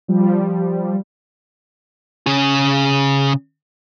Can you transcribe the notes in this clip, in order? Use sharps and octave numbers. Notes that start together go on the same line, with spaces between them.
F3 G3
C#3 G#4